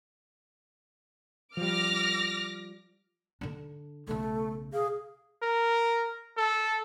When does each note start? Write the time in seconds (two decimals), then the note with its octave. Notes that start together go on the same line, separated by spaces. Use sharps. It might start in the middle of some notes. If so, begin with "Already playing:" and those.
1.57 F3 G3 D6 F6 A#6
3.41 D3 D4
4.07 B1 C#3 A3
4.73 G#4 F5
5.42 A#4
6.37 A4